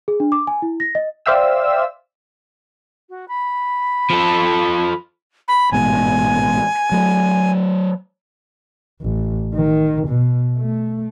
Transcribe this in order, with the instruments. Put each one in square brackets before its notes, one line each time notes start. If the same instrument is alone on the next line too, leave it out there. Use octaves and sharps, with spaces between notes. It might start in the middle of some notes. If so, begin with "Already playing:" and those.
[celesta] G#4
D4
D6
G#5
E4
A#6
D#5
[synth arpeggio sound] C5 D5 E5 F5 G5 E6
[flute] F#4
B5
[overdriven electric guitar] F3 A4
[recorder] B5
[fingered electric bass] A1 G#2 B2 [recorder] G#5
[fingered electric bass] F#3 A3
[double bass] A1
D#3
B2
A3